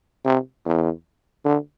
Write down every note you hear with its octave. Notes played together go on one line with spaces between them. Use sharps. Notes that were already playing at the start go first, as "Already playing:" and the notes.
C3
E2
D3